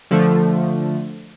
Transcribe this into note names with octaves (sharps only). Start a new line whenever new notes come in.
D3 F3 A3